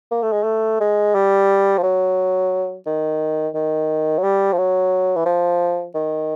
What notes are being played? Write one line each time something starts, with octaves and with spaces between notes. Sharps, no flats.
A#3
A3
G#3
A3
G#3
G3
F3
F#3
D#3
D#3
F#3
G3
F3
F#3
E3
F3
D#3